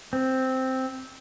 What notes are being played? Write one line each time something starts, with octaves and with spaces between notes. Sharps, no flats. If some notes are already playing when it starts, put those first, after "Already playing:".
C4